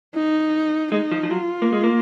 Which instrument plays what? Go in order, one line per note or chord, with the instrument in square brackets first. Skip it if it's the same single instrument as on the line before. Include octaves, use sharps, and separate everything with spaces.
[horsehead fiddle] D#4
[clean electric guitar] G#3 [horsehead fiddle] D#4
[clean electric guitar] F3
F3
[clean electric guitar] F#3 [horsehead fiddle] F4
[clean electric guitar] A#3
G#3
A#3